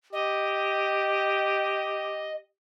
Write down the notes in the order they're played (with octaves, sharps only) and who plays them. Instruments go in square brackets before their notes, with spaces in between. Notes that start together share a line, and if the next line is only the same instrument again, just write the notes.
[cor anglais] G4 [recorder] D#5